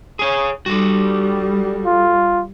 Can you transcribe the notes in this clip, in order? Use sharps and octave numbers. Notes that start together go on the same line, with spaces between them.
G#4 C#5
G3 F#4 A4
F4